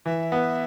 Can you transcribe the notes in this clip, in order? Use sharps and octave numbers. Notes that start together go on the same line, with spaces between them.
E3 E5
B3